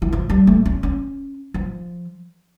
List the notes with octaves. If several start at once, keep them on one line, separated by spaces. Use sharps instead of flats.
E3
F3
G3
A3
C#4
C#4
F3